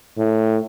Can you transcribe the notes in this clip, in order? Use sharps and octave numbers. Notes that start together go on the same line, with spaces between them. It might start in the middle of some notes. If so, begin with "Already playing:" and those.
A2